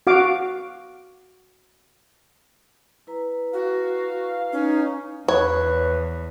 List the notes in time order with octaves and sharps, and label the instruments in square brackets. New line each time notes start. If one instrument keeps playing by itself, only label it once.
[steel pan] F#4 F5 D6
[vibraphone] E4 B4 A#5
[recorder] F#4 [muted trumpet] F5
[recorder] C#4 [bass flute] D#4
[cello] E2 [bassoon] B4 [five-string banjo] C#5